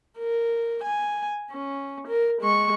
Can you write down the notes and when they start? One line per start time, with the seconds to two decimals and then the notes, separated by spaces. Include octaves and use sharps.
0.18 A#4
0.83 G#5
1.51 C#4
2.07 A#4
2.42 G#3 C#6